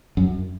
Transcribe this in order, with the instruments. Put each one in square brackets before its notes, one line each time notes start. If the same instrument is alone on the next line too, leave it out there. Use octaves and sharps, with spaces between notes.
[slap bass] F#2